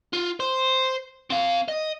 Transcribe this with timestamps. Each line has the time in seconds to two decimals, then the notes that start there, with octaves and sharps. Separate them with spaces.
0.13 F4
0.40 C5
1.30 C4 F5
1.68 D#5